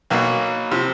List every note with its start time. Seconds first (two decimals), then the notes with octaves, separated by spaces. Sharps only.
0.10 B1 B2 F#3 A#3
0.71 C3 F3